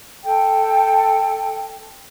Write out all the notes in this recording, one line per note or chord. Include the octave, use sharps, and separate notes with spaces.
A4 G5